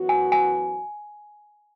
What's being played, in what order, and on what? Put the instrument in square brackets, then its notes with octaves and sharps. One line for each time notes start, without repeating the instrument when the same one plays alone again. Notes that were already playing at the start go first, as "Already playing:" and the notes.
Already playing: [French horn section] F#2 E3 B3 F#4
[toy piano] G#5
G#5